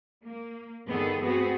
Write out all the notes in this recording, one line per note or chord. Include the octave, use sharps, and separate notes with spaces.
A#3
G2 D3 D#3 B3 G#4 A4
A3 B3 C4 F#4 G#4